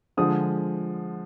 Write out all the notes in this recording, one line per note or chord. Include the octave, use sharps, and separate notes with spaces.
D3 F3 G#3 D#6